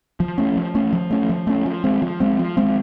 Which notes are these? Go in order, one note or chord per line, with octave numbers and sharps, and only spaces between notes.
F3
A3 C#4
F3
A3 C#4
F3
A3 C#4
F3
A3 C#4
F3
G#3 C4
F3
G#3 C4
F3
G#3 C4